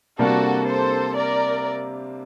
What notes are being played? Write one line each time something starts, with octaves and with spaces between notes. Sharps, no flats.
C3 G3 A#3 D4 F#4 A4
A4 C5
A#4 D5